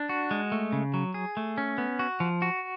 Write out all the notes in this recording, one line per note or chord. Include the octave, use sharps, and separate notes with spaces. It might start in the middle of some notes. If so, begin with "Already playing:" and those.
Already playing: D4
F#4
G#3
A3
C#3
F#3
G#4
A3
C#4
B3
F#4
F3
F#4